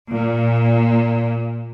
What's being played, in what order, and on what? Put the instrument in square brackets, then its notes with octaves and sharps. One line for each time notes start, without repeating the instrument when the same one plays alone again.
[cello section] A#2